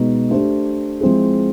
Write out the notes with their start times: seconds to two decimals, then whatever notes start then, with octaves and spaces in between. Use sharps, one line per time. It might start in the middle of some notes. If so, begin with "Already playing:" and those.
Already playing: B2 G#3 B3 D#4 F#4
0.30 A3 D4 G4 C5
1.01 F3 G#3 C4 E4 G#4